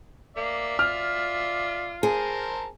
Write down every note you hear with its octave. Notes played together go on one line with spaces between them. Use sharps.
A#3 D5 E5
F4 F6
G#4 A#4 C5 A5